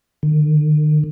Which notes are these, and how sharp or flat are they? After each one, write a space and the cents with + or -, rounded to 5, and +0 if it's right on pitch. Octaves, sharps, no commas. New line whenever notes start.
D#3 -45